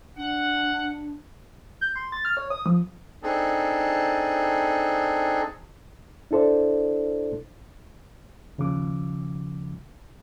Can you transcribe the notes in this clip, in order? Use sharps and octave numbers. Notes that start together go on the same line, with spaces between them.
D4 F#5
G6
C6
A6
F6
C#5
D#6
F3
C4 D4 D#4 G#4 A4
D4 E4 A4 C5 D5
D#2 C#3 F3 D6